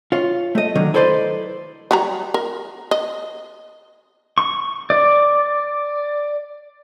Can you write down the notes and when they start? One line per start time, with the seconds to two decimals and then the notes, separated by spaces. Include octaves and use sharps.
0.12 F4 C#5
0.55 A3 D#5
0.75 D3 D#3 F#3
0.94 E4 A4 B4 C5 D5 D#5
1.91 F#3 G3 A#5
2.34 A#4
2.91 D#5
4.38 C#6
4.90 D5